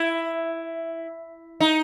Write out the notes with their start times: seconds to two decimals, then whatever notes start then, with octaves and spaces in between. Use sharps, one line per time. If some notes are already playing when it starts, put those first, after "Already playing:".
Already playing: E4
1.60 D#4